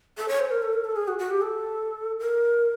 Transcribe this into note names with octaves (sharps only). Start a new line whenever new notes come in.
A4
C#5
C5
A#4
A4
A#4
A4
G#4
F#4
F#4
G4
A4
A#4